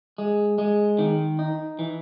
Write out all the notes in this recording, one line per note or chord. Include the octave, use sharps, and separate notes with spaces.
G#3
G#3
D#3
D#4
E3